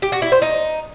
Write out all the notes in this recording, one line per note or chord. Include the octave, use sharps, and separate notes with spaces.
G4
F#4
E4
C5
D#4